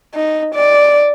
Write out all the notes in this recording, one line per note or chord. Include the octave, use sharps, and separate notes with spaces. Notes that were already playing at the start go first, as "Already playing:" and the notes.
D#4
D5